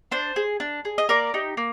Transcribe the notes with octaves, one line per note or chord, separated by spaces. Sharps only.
D4 C5
G#4
D4
G#4
D#5
A#3 A#4 D5
D#4 G4
A#3